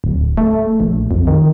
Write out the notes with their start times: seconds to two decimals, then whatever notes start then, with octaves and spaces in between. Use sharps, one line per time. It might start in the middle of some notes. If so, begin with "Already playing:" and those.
0.04 D1
0.37 A3
0.80 A#1
1.11 F2
1.27 D#3